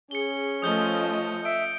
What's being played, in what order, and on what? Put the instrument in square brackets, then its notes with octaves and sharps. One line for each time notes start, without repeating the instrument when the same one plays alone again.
[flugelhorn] C#4 [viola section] G#4 [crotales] C#7 G7
[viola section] F3 A3 D#5 [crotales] D#6 G6 G7
[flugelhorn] E5 [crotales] D7